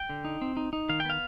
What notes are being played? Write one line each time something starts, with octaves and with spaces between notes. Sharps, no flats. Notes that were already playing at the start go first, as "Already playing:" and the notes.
Already playing: G5
D3
D#4
C4
D#4
D#4
D#3 F5
G5
B3 F5